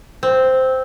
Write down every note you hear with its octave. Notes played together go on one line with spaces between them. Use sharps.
C4